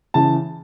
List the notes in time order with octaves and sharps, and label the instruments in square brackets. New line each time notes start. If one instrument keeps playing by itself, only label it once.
[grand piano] C#3 E3 A5